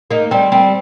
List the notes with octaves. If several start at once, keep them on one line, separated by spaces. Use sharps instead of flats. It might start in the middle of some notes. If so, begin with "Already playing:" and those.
A#3 D#4
G3 C4
G3 C4